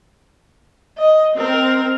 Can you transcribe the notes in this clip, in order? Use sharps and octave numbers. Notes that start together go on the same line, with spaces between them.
D#5
C4 A#4